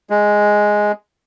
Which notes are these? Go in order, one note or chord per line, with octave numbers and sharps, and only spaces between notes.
G#3